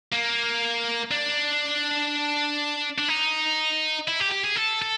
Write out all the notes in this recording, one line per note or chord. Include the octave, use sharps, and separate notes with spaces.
A#3
D4
D4
D#4
E4
G4
G4
G#4
A4
A4